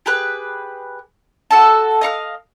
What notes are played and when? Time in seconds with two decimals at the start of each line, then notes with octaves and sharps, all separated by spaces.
0.06 G4 G#4 B4 F#6
1.51 F#4 A4 A5
2.01 D#5 F5 C#6 F6